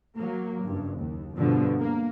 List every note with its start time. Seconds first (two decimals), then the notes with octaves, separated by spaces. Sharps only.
0.16 F#3 A#3
0.63 F#1 G2
0.98 D#2
1.36 G2 B2 D3 F3
1.79 A#3